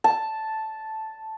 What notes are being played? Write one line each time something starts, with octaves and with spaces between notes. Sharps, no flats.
A5